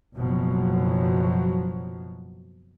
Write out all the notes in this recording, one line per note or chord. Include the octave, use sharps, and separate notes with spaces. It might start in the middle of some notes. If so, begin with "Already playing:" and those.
F#1 B2 F3 F#3